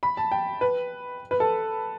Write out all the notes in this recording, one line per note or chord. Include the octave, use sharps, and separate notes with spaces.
B5
A5
G5
B4
B4
A4